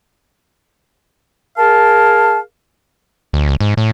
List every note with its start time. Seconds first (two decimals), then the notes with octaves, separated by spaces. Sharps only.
1.58 G#4 A#4 F5 A5
3.33 D2
3.48 C#2
3.61 G#2
3.77 A2